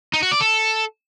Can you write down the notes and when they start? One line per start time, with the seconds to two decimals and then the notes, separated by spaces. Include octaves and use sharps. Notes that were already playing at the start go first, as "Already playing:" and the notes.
0.13 D#4
0.23 F#4
0.32 D5
0.41 A4